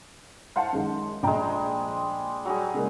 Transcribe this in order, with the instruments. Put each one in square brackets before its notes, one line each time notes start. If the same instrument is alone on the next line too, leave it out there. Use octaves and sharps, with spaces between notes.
[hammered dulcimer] C5 [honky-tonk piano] F5 F#5 A5
[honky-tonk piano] F#2 D#3 G#3
[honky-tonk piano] A#1 G5 A#5 [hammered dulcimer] G3 G#3
[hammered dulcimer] F#3 G3 G#4
[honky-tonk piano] C#3 G#3 A#3